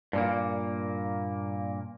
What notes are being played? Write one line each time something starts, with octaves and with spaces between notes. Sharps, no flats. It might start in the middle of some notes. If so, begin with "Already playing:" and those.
G2 A#2 A#3